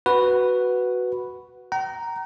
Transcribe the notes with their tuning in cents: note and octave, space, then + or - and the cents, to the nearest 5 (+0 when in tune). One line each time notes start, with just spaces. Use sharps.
F#4 +0 B4 +0
G5 -45 A#5 +0